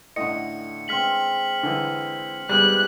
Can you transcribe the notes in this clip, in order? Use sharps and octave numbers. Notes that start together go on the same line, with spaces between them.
A2 D3 D#5 C#7
G#3 C4 F6 B6 F#7
D3 E3
G3 G#3 B3 F#6